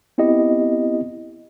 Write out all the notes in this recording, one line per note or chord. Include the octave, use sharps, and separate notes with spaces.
B3 C4 E4 G4 D#5